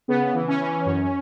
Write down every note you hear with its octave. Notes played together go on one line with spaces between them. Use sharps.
C#3 B3
E3
C#4
E3
F#2